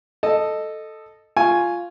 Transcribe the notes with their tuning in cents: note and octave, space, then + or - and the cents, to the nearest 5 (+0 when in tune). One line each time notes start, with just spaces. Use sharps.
A4 +0 D#5 -10
F4 +0 G#5 +5 C#6 +0